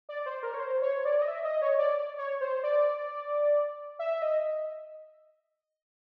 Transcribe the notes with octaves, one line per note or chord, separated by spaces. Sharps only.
D5
C5
A#4
C#5
C5
C#5
D5
D#5
E5
D#5
C#5
D5
C#5
C5
D5
E5
D#5